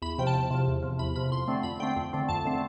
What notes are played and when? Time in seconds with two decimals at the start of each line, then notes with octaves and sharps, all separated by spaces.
0.02 E2 B5
0.18 C3 F3 G5
0.27 A5
0.34 E2
0.50 C3 F3
0.67 E2
0.83 C3 F3
0.99 E2 B5
1.16 C3 F3 B5
1.31 F2 C6
1.48 D3 A3 C4
1.63 F2 B5
1.80 D3 A3 C4 G5
1.96 F2
2.13 D3 A3 C4
2.29 F2 A5
2.45 D3 A3 C4